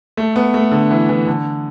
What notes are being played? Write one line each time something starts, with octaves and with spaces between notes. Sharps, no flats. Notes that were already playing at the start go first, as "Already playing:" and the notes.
A3
B3
A3
D3
E3
E3
D3